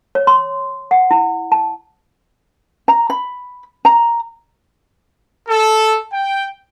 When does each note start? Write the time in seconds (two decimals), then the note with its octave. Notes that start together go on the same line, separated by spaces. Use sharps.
0.15 C#5
0.27 C6
0.91 F#5
1.11 E4
1.52 A5
2.88 A#5
3.10 B5
3.85 A#5
5.49 A4
6.11 G5